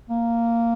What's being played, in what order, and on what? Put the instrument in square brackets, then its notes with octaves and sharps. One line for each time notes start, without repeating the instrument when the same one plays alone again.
[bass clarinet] A#3